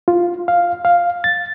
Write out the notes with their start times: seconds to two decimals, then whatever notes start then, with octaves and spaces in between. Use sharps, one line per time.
0.08 F4
0.48 F5
0.85 F5
1.24 A6